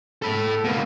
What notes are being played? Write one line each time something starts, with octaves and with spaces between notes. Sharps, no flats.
A4 B5
B2 A#3